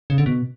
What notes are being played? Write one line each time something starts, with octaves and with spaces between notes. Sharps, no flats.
C#3
D3
B2